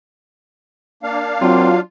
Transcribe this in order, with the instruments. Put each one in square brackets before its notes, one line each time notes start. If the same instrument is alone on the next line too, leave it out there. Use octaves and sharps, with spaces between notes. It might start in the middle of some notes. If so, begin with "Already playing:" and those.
[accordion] A#3 D4 F5
[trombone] F#3 [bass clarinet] C4 [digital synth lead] F4